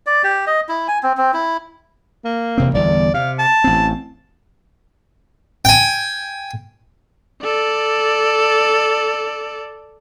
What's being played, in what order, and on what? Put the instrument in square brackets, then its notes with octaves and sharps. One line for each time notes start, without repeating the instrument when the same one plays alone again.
[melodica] D5
G4
D#5
E4
G#5
C4
C4
E4
[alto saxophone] A#3
[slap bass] E1 C3 C4
[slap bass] G1 E2 [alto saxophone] D5
[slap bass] C3 [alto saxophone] F5
[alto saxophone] A5
[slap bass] A1 C4
[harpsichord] G5 G#5
[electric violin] A4 D5